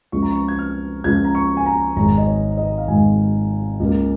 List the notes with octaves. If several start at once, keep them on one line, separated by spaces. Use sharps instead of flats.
C#2 C#3 F3 C#6
A#5
C#6
G#6
F6
C#2 C#3 F3 G#6
A#5
C#6
G#5
A#5
G#1 G#2 G#3 A#5
D#5
C#5
D#5
F5
G#1 G#2 G#3 G#5
C#2 C#3 A#3